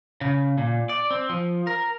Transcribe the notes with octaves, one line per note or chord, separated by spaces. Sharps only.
C#3
A#2
D5
C4
F3
A#4